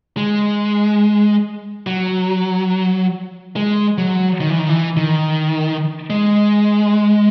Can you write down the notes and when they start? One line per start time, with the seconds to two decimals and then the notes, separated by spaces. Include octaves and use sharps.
0.17 G#3
1.87 F#3
3.56 G#3
3.98 F#3
4.41 D#3
4.50 E3
4.59 D#3
4.69 E3
4.97 D#3
6.10 G#3